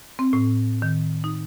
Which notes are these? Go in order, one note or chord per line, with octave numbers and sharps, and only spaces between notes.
C4
A2
D#3
D#4